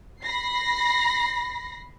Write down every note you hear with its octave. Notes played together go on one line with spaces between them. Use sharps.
B5 A#6 C7